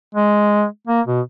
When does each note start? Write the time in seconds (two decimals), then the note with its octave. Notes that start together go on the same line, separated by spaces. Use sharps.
0.15 G#3
0.87 A#3
1.07 B2